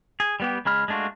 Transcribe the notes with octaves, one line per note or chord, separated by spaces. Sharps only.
G#4
G3 B3 G4
C#3 G#3 B5 F6
G#3 A3 D4 F4 F#4